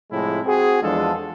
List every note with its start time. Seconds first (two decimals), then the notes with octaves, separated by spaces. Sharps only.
0.11 A2 C3 F3 G#3 E4
0.45 C4 F#4 G#4
0.82 E2 F3 G#3 D4 A4